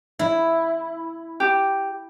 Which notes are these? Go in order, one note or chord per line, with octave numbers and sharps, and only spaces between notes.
E4
G4